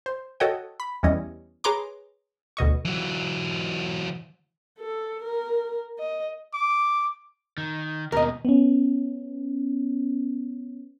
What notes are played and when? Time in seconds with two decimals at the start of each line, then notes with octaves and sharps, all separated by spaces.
0.06 C5
0.40 F#4 A4 C#5 D#5 F#5 G5
0.80 B5
1.03 E2 E3 G3 C#4 D#5
1.64 G#4 B4 C#5 A#5 C6 D6
2.57 D2 B2 D#5 C#6
2.85 E3 F#3
4.79 A4
5.23 A#4
5.99 D#5
6.54 D6
7.58 D#3
8.12 D#2 B2 A#4 D#5
8.45 B3 C#4